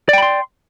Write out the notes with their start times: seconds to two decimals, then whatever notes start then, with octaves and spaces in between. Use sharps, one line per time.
0.09 D5
0.13 G5
0.18 B5
0.23 C6